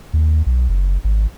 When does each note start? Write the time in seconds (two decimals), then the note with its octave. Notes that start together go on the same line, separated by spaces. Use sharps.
0.14 D#2
0.46 B1
0.69 F#1
1.04 G#1